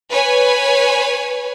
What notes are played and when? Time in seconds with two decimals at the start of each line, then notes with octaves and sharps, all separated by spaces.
0.11 B4 C#5 G#5